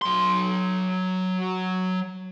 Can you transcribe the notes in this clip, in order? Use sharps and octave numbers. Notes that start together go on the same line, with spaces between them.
F#3 C6